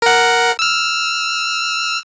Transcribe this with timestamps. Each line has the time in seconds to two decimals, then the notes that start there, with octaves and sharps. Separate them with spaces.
0.02 A#4 F#5
0.59 E6 F6